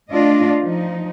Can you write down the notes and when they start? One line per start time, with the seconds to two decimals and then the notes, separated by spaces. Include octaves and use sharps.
0.10 A3 D4 F4 D#5
0.63 F3 D#4